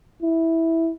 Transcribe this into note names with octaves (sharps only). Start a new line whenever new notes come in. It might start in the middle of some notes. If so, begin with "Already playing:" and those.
E4